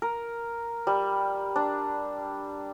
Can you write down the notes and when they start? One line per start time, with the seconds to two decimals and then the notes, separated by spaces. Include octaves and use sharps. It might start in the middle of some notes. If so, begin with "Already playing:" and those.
0.02 A#4
0.87 G3
1.56 D4